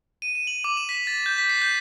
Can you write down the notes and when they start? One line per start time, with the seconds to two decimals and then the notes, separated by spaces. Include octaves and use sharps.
0.22 D#7
0.35 E7
0.47 F#7
0.64 D6
0.77 E7
0.89 B6
1.07 A6
1.26 G6
1.38 B6
1.49 C7
1.62 G6